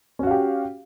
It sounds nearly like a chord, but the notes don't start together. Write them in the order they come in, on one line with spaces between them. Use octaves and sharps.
C#4 F#4 F5 G4